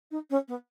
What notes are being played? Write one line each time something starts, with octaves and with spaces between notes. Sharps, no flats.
D#4
C#4
B3